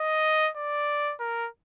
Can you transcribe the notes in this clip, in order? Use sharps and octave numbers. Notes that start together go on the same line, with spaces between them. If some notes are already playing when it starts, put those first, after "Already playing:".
Already playing: D#5
D5
A#4